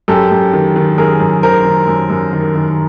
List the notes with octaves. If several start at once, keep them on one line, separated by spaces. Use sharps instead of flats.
F#2 G4 A4
F#2
D#3
D#3
F#2 G#4 A#4
F#2
D#3 A#4 C5
D#3
F#2
F#2
D#3
D#3